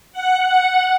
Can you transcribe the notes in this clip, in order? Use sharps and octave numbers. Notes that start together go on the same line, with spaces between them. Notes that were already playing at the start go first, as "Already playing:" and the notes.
F#5
F#5